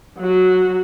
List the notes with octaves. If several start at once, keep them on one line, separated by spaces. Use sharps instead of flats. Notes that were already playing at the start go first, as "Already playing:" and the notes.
F#3 F#4